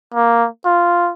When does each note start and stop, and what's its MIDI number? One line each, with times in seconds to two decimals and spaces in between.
0.14 0.47 58
0.65 1.11 65